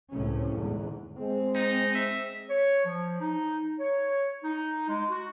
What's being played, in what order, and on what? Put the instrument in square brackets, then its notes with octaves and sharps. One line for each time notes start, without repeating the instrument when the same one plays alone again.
[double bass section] C#2 A2 C3 C#4
E2 G#2 D3
[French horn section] G#3 [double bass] C4
[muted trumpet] D#4
E5
[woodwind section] C#5
F3
D#4
C#5
D#4
G#3
F#4